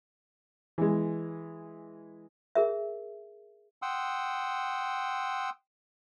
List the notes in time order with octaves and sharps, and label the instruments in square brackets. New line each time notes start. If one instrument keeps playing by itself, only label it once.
[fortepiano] E3 G#3
[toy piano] G#4 A#4 E5
[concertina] F#5 G5 C6 D#6 E6